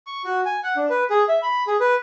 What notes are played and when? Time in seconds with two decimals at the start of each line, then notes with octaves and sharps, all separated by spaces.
0.07 C#6
0.25 F#4
0.45 G#5
0.63 F#5
0.76 D4
0.90 B4
1.10 G#4
1.28 E5
1.42 B5
1.67 G#4
1.80 B4